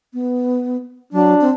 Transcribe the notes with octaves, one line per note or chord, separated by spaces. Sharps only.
B3
F#3 D4
C4